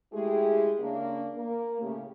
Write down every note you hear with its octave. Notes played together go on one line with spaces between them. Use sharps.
G#3 A3 E4 G4 G#4
C#3 A#3 D4
A#3
A2 C#3 G4